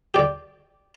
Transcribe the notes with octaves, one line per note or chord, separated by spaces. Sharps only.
G4 D5